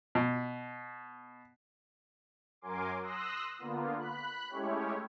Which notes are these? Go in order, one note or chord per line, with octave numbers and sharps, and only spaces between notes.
B2
F#2 F#3 A#4 G#5 C6 D6
C6 D#6 E6 F#6 A#6
D3 A#3 B3 F4
B5 F#6
G#3 A3 C#4 E4 G4 C#5